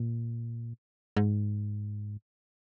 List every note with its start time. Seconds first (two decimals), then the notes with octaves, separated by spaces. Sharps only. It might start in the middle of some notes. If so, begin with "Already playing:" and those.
Already playing: A#2
1.17 G#2